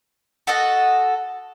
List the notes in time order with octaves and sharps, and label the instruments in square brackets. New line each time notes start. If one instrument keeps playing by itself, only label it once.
[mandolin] F#4 A4 D#5 F#5